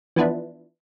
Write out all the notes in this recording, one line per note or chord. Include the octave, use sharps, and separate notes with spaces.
E3 F3 B3 D4 E4